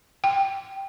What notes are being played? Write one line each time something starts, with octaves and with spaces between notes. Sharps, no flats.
G5